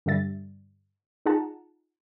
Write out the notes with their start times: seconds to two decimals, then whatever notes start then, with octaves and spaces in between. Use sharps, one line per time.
0.06 G2 D3 G3 E5 A6
1.26 D#4 F4 G#4 F#5 A5 A#5